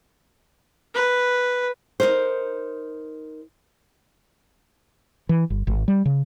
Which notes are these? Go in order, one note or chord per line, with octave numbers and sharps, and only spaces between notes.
B4
D#4 A#4 C5
E3
G1
G#1
G3
C#3